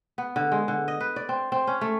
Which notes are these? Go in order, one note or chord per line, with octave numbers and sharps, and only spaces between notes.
B3
D3
G#3
D3
D#5
B4
D5
C4
C4
C#4
A3